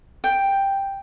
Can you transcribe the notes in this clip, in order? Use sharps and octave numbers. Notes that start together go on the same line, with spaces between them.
G5